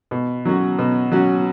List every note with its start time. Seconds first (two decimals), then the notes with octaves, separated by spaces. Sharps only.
0.11 B2
0.45 F#3 C#4 F#4
0.79 B2
1.11 F#3 C#4 F#4